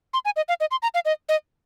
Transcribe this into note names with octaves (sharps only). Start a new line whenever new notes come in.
C6
G#5
D#5
F5
D#5
C6
A#5
F5
D#5
D#5